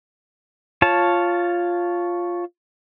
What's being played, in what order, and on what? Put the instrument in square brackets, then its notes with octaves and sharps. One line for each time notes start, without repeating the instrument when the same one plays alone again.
[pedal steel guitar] F4 C#5 A5